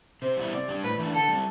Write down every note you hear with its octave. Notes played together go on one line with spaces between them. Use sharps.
C3 C5
G3 B3 E4
C3 D5
G3 D4
A2 B4
E3 A3 D4
D3 A4
G3 C4